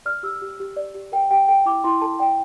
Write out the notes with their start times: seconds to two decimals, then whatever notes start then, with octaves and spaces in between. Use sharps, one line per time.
0.06 D5 F6
0.23 G4 E6
0.42 G4
0.60 G4
0.76 D5
0.94 G4
1.12 A#4 G5
1.31 G4 G5
1.48 A4 G5
1.66 E4 D6
1.84 E4 C6
2.01 A4 A5
2.19 D5 G5